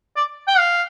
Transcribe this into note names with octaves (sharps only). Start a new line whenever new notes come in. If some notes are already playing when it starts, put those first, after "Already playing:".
D5
G5
F5